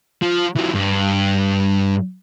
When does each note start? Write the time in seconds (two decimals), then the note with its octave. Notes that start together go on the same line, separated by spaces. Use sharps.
0.22 F3
0.56 E3 F#3
0.75 G2